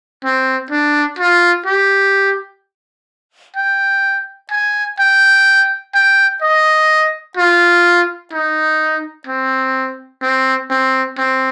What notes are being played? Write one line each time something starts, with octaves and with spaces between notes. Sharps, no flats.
C4
D4
F4
G4
G5
G#5
G5
G5
D#5
F4
D#4
C4
C4
C4
C4